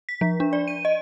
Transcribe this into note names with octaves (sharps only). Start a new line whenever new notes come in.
B6
F3
D4
D5
D#7
D#5